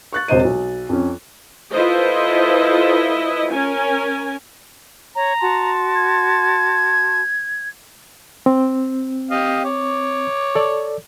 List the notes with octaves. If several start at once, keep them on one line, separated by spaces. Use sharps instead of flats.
C#6 F#6 A6
E1 C3 C5 D#5 D#7
B1
F2 C#4
E4 F4 A4 B4 C5 D#5
C#4 A#4 G#5
C#5 A#5
F#4 A5 C6
G#6
C4
G4 D#5 F5
C#5 D6
A4 D5